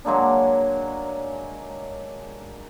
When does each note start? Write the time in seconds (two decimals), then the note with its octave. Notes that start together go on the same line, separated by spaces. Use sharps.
0.05 F#3 G#3 A#3 D4